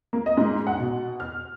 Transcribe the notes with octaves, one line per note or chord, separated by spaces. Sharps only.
A#3
D#5
G#2
F#5
B2
F6